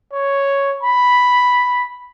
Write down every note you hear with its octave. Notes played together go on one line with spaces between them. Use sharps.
C#5
B5